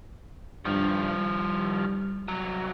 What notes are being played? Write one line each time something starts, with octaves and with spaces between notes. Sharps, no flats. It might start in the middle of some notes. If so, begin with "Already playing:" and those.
G2 D#3 F3
G3
C2 F#3